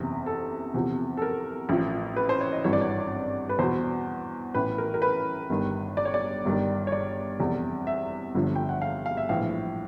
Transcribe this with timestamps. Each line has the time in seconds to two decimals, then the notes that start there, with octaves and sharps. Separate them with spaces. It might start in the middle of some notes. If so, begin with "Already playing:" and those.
Already playing: F#1 E2 C3
0.26 A4
0.74 E2 C3 F3
1.17 A4
1.22 A#4
1.69 A1 A2 F3
2.16 B4
2.29 C5
2.41 C#5
2.52 D#5
2.64 G#1 G2 E3 C#5
2.73 D5
2.81 C#5
3.49 B4
3.59 E2 B2 C5
4.54 A1 A2 E3 B4
4.78 A#4
4.94 A#4
5.02 B4
5.50 G1 G2 D#3
5.97 D5
6.05 C#5
6.14 D5
6.45 G1 G2 D#3
6.87 C#5
6.92 D5
7.39 F1 E2 C3
7.87 E5
8.34 G1 G2 D3 F3
8.55 G5
8.69 F#5
8.82 F5
9.06 F5
9.17 E5
9.29 A#1 A2 E3 F5